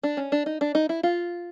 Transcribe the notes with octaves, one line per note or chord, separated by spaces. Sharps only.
D4
C#4
D4
D#4
D4
D#4
E4
F4